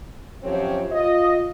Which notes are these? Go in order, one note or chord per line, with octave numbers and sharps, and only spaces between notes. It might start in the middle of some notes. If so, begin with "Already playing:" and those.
F#2 F3 C4 G4 C#5
F4 D#5